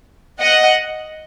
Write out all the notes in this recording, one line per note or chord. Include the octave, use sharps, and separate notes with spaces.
D#5 F#5